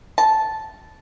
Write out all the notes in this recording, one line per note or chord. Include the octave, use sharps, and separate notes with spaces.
A5